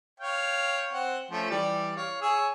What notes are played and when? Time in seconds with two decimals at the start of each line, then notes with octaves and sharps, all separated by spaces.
0.20 C#5 F5 G5
0.92 C4 F#5
1.31 F3 A3 C#4
1.50 E3 G3 D5
1.97 C#5 F5
2.22 G#4 C#5 E6